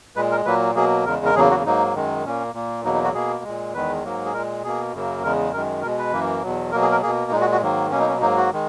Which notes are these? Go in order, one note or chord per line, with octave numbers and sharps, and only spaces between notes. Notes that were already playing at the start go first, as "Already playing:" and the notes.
A#2 G#3 B4
A#4
A#2 F#3 A#3 B4
B2 F#3 A#3 G#4
E2 C#3 G#3 A#4
A#4
E2 C#3 F#3 A#3 G#4
F#4
G#2 F#3 A#3 D#4
F#2 D#3 G#3
A#2 A#3 C#4
A#2 A#3
E2 B2 F#3 A#3 D#4
D#4
F#4
B2 A#3 G#4
A#2 G#3
E2 D#3 G#3 B4
G#2 F#3 A#3
G#4
A#2 G#3 A#4
B2 A#3 G#4
F#2 C#3 F#3 A#3
E2 C#3 G#3 A#4
F#2 D#3 G#3 A#4
B2 G#3 A#4
B4
F#2 E3 A#3
E2 B2 F#3
B2 F#3 A#3 A#4
G#4
A#4
B2 A#3 G#4
A#2 G#3 D#4
F#4
F#4
G#2 D#3 F#3 A#3
B2 F#3 A#3 C#4
D#4
C#4
G#2 F#3 A#3 D#4
F#4
D#3 G#3